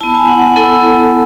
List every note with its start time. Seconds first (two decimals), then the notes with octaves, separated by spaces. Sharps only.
0.01 B3 E4 A5
0.15 G#5
0.28 F#5
0.42 F#5
0.56 B3 E4 A4